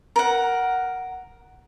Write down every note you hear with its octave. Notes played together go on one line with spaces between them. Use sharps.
A#4 F#5